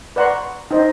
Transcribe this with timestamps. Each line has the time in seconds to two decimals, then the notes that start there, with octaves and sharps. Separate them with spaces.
0.16 B4 D5 F#5 A#5 C6 C#6
0.71 D#4 C5 D#5